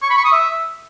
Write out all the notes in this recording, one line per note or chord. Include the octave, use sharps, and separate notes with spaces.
C#6
B5
C#6
D#6
E5